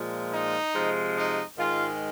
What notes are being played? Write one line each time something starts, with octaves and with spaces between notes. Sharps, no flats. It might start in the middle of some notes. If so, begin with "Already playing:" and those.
Already playing: A#2 F3 G#3
D#4
C3 F3 G#3
D#4
G#2 D#3 G#3 F4